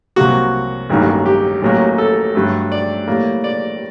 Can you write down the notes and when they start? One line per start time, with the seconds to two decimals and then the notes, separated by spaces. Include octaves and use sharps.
0.16 C2 C3 F#3 A#3 F#4
0.90 A1 G2 D#3 F#3 A#3
1.26 G4
1.62 A1 A2 F#3 A#3
1.98 A4
2.35 G2 F#3 A3
2.72 D5
3.08 A2 G3 A#3
3.44 D5